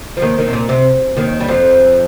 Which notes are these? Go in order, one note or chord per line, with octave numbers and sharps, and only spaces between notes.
F3
D#2 D#3
D#2 D#3
C3
A#2
C3
D#2 D#3
G3
F2 F3